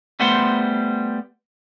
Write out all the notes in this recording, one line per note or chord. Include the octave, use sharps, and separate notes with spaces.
G3 A3 B3 C5 F#5 C6